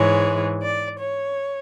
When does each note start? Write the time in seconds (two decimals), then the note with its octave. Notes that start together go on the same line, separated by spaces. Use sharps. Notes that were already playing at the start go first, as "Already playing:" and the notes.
Already playing: G#2 E3 G#3 C#5
0.62 D5
0.99 C#5